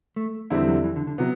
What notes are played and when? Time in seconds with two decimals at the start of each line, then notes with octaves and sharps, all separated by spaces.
0.16 A3
0.50 E2 D3 G3 C4 E4
0.68 F#3
0.84 E3
0.96 D3
1.07 D3
1.18 C3 F#3 B3